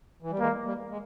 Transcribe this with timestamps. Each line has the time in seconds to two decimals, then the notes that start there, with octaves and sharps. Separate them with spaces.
0.22 E3
0.31 G3
0.40 E3 G#3 A#3
0.65 G3 A#3
0.90 G#3